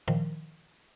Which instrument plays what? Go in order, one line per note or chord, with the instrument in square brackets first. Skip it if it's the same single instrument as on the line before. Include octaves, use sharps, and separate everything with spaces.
[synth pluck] A#2 D#3 F3